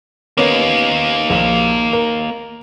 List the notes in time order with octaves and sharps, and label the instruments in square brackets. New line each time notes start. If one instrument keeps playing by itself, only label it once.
[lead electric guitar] A#3 D#4 [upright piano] B3 C#4 A#4
[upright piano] A#1 F5 F#7
A#4